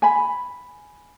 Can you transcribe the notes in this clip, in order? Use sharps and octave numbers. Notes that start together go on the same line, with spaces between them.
G#5 B5